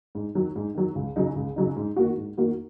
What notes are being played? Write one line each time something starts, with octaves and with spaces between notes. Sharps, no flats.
G#2
D#3 F#3
G#2
D#3 F#3
C#2
C#3 F#3 D#4
C#2
C#3 F#3 D#4
G#2
D#3 A#3 F#4
G#2
D#3 A#3 F#4